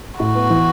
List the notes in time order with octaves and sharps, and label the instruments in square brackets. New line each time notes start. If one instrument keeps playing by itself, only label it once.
[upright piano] A2 [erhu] F#4
[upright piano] B3
E3